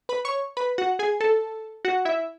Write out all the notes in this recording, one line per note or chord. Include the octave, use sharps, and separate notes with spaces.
B4 B5
C#5 C#6
B4 B5
F#4 F#5
G#4 G#5
A4 A5
F#4 F#5
E4 E5